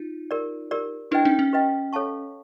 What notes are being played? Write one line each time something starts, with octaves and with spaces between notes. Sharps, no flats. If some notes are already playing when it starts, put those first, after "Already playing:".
Already playing: D#4 F4
G4 A#4 D5
G4 A#4 D5
D4 E4 G4 B4 D#5 G5
C#4 D#4
C#4
G4 B4 D#5 G5
A4 C#5 F5 A5 C#6